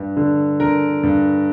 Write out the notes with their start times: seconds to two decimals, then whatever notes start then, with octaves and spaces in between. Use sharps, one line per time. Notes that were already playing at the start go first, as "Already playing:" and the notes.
Already playing: G2
0.17 D3
0.60 D3 A#4
1.03 G2